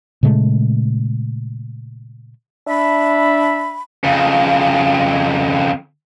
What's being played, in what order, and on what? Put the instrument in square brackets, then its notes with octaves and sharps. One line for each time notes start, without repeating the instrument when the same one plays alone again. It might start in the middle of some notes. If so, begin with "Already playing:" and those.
[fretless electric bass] A#2 C#3 G#3 A3
[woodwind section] D4 E5 B5
[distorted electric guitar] F2 C#3